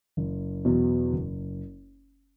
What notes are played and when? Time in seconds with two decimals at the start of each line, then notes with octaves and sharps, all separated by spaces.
0.17 F#1
0.65 E2 B2 F#3
1.13 F#1